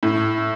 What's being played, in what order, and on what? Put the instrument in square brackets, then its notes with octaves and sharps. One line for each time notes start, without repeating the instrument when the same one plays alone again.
[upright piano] A2